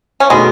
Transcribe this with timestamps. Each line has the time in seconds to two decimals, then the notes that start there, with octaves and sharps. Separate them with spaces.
0.20 C#4
0.30 B2 G#3 A3 B3 D#4 F#4